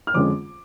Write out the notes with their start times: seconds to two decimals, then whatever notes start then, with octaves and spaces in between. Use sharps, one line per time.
0.07 F6
0.14 F2 D3 G#3 C#4 F4 D6